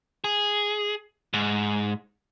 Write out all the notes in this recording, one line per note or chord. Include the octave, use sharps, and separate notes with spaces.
G#4
G#2